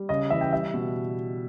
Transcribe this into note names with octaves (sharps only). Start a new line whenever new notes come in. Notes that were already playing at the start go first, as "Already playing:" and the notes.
Already playing: G3
C#3 D#5
E3 E5
G5
G3 E5
B2